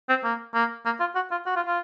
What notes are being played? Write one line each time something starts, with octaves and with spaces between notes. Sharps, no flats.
C4
A#3
A#3
A#3
F4
F#4
F4
F#4
F4
F4